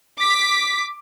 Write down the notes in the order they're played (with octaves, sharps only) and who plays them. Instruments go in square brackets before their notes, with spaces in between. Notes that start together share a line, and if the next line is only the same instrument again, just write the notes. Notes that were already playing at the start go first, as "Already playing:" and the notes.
[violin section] D6 B6